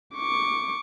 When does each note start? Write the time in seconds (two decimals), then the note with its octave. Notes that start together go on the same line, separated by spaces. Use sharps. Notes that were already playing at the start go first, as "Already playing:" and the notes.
0.16 C#6 D6